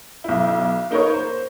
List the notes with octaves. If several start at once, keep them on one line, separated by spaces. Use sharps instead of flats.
B1 E4
A#3 D#4 A#4 B4 C#5
C5